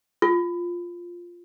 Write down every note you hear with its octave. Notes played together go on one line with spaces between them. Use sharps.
F4